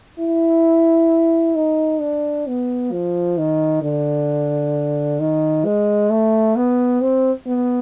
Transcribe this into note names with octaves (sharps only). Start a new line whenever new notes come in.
E4
D#4
D4
B3
F3
D#3
D3
D#3
G#3
A3
B3
C4
B3